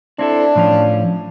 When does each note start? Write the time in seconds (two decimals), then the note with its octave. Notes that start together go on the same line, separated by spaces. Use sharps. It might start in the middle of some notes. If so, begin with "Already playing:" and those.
0.19 C4 D4 E4 A4
0.56 A2 F3 C#4